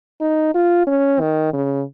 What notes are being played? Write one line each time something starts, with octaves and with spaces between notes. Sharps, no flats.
D#4
F4
C#4
D#3
C#3